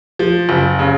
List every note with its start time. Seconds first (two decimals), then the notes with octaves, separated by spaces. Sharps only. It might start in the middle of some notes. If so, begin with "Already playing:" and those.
0.19 F3
0.49 F#1
0.79 C#3